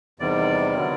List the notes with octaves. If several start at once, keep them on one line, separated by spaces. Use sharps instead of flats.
E2 C3 D#3 G3 D5
D3 F#3